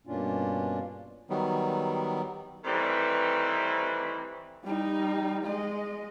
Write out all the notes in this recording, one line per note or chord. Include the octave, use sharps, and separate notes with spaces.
G2 B2 A#3 C#4 D4 F4
D#3 F#3 G3 B3
D#3 E3 G3 A3 C4 B4
G3 D#4
G#3 D#5